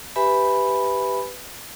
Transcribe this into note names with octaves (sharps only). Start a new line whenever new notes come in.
G4 B4 E5 G#5 B5